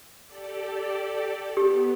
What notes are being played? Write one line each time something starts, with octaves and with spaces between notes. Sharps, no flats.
G4 A4 D5
B3 G4